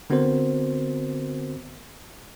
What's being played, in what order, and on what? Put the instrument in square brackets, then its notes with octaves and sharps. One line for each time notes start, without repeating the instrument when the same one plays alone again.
[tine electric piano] D3 B3 C4 F#4 A#4 C5